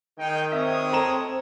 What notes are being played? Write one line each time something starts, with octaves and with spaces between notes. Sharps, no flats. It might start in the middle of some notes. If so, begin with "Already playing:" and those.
D#3 G#3 D#4 G5
G#3 C4 C#5 E5 D#6
A4 A#5 E7